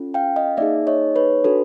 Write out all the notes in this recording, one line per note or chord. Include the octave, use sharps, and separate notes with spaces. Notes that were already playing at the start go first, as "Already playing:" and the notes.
Already playing: C#4 F4 A4
F5 G5
D#5 F5
A#3 D#4 G#4 D5 E5
C#5 D#5
B4 C#5
D4 F#4 A4 B4